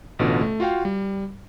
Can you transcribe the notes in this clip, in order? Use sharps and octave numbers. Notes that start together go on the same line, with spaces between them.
A1 B2 D3 F4
A3
F4 F#4 F5 G5
G3